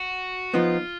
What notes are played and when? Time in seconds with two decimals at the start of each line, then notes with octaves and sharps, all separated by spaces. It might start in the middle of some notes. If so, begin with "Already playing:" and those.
Already playing: F#4
0.54 F3 B3 D#4 F4